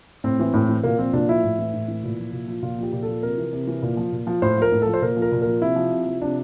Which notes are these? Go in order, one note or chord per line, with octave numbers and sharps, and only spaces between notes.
A2 C4
E3
A2
E3
A#2 A#3
F3 C4
A#2 D4
F3 E4
A2
E3
A2
E3
A#2
F3
A#2
F3
A#2 F4
F3 G4
A#2
A4
F3
C3 A#4
E3
C3
E3
A#2
F3
A#2
F3
A2 C5
F3 A#4
A2
F3 A4
C5
A#2 A#4
F3
A#4
A#2
A#4
F3
C3 E4
F3
C3
F3
C3 D4